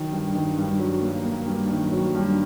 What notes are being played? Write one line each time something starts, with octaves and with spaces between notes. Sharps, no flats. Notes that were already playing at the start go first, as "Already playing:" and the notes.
Already playing: D#3 F#3
G2
D#3
G2
F#3
A#3
A#3
G2
D#3
F#3
G2